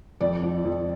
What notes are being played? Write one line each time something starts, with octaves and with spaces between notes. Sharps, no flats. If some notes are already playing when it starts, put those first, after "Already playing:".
F2 D5
F3
F2